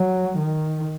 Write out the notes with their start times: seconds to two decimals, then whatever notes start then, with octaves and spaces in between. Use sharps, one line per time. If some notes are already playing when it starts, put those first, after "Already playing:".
Already playing: F#3
0.37 D#3